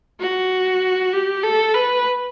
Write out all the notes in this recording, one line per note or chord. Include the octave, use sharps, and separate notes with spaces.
F#4
G4
A4
B4